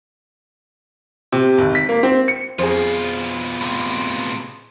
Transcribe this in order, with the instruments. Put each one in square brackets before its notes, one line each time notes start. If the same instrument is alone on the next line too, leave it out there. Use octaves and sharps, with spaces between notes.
[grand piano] C3
G#1
B6
A#3
C4
C#7
[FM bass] F2 [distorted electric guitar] B2 F4 [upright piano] G#4 C5
[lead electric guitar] A2 C3